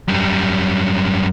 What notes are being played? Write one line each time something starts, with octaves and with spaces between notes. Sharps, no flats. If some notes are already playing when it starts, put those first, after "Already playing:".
F#2 G3